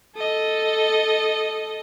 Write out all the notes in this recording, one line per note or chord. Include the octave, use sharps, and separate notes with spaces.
A4 D#5